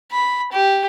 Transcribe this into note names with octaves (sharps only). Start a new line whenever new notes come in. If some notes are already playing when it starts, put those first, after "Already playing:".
B5
G4